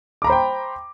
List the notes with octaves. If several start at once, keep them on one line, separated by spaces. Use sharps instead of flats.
C5 G5 A#5 B5 D6